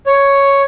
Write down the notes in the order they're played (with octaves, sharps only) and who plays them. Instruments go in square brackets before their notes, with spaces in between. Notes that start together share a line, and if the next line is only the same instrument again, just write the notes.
[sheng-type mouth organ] C#5